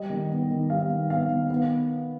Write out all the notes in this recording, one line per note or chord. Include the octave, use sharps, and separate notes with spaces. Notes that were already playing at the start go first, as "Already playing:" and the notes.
Already playing: G3 D#5
D#3
B3
D#3
G3 F5
D#3
B3 F5
D#3
B3